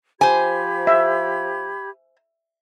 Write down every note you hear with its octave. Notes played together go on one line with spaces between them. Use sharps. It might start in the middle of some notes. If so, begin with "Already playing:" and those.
F3 G4 C5 G#5 B5 G#6
E5